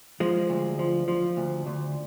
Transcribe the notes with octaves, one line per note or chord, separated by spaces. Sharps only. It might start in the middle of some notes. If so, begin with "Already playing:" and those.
F3 G#3
D2
F3
F3
D2
D2